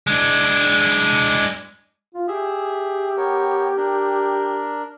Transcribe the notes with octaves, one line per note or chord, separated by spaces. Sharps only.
G#3 D4
F4
G4 G#4 E5
B3 A#4 C#5
D4 A#4